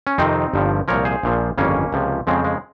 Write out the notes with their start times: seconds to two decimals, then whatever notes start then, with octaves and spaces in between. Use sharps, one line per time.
0.07 C#4
0.18 F2 C3 D#3 C4 D#4
0.54 G1 G2 F3
0.88 C2 A#2 F3 A#4 C#5
1.05 G#4 C5
1.23 A#1 A#2 F3
1.58 G1 F2 C#3 A#3 C#4
1.93 C#2 C3 F3
2.27 F2 C#3 F3 G#3 C4
2.44 G#3